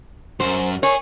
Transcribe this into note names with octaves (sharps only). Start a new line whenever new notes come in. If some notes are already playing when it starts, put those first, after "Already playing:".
F#2 F#3 C5
A#4 C#5 G#5